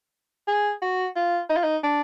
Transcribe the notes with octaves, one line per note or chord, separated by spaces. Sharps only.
G#4
F#4
F4
D#4
F4
D#4
D4